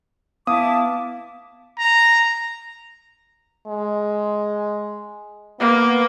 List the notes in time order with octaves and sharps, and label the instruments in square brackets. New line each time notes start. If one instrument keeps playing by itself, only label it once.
[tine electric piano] B3 [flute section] E4 A5 D6 [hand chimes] F5 [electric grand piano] D#6
[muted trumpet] A#5
[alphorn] G#3
[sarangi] A#3 [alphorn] B3